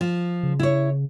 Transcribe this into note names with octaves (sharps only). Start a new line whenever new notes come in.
F3
C#3
E4 C#5